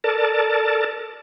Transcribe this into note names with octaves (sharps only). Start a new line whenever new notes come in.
A4 A#4 D5 A5